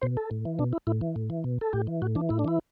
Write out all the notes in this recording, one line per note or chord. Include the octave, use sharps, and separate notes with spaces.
B2 C5
A4
A2
E3
B2 D4
E4
A2 E4
E3
A2
E3
B2
A4
A2 G4
E3
A2 F#4
E3 D4
A2 E4
D4
E3 E4